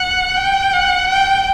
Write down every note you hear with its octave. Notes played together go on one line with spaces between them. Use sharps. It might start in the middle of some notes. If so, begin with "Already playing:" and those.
Already playing: F#5
G5
F#5
G5